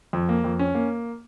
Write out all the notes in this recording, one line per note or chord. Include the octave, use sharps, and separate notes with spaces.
F2
A#3
F2
C#4
A#3